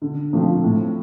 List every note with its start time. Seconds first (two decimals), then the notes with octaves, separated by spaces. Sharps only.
0.02 D3
0.33 F3 A3 C4 F4
0.63 A2